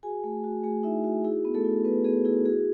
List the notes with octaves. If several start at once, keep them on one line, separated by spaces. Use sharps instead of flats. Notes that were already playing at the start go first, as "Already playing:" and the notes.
F#4 G#4 G#5
A3
F#4
A3 G#4 G#5
D#4 E4 E5
F#4
E4 G#4
B3
A3 A4
E4
B3 B4
B3 G#4
E4 G#4
F#4 G#4